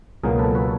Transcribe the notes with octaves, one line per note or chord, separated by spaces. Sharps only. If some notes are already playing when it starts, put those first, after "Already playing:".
C#2 B2 F#3 A#3 G#4 A#4
A4 B4
B4 C#5